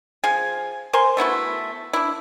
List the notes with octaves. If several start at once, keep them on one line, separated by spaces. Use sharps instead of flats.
F3 G#4 G#5
A#4 C5 G#5 C6
A3 B3 E4 F#4
D4 E4